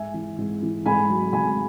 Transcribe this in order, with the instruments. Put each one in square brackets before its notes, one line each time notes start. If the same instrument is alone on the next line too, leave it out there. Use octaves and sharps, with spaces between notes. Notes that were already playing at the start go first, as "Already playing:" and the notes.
Already playing: [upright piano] G#2 E5 G#5
E3
G#2
E3
G#2 G#5 B5
F#3
G#2 G#5 B5